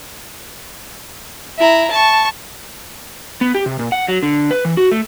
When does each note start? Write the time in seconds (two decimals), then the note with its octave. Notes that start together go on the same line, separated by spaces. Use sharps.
1.58 E4 A#5
1.90 A5 C#6
3.41 B3
3.55 G4
3.66 C3
3.79 A#2
3.92 F#5
4.08 F#3
4.23 D3
4.51 B4
4.65 E3
4.77 F#4
4.92 A3